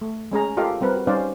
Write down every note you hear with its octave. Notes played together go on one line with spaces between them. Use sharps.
A3
G#3 C#4 G#4 A#5
F4 G4 A4 A#4 D#5 F5
G3 C4 A#4 B4
F#4
G3 C#4 D#4 C5 D5 F5